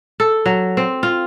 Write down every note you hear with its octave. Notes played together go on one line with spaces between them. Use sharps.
A4
F#3
C4
F4